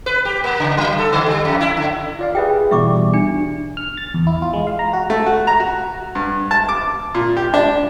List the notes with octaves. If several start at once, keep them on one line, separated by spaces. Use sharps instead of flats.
B4
G4
A#3
C#3
F#3
A4
D3
G3
F2
E4
D3
F4 D5 F5
G4 G#4 B4 E5 G5
B2 E3 G3 E5 C#6 D6
D4 C#7
F6
A6
E2
E4
F4
G#3
F5
A#5
F#4
A3
F#4
A#5
F#4
G2
A5
D6
A#2
G4
D4